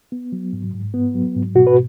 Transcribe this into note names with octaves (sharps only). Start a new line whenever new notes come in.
B3
F#3
G#2
G#2
B3
F#3
G#2
B2 F#4
B4